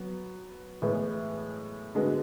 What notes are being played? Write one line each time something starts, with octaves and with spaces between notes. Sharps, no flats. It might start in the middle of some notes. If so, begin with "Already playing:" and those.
Already playing: F#3 B3
A2 E3 G#3 B3
D3 G#3 B3 F#4